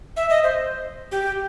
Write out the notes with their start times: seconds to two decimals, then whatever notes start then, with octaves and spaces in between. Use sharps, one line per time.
0.16 E5
0.30 D#5
0.43 C5
1.11 G4